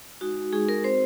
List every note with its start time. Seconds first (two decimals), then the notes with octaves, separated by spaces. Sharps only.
0.21 G#3 D#4 F#4
0.52 G#3 D#4 F#4 G#4
0.69 A#4
0.84 C4 F#4 C5